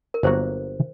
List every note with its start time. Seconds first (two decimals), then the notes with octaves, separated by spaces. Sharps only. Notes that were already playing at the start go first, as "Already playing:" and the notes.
0.14 A#4
0.23 G1 G2 F#3 A#3 F#4 C5